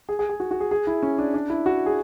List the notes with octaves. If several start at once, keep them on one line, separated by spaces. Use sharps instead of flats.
G#4
G#4
G#4
F#4
F#4
G#4
G#4
E4
C#4
D4
D4
E4
F#4
G#4